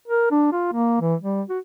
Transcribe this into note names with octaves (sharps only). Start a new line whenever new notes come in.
A#4
D4
F4
A#3
E3
G3
F#4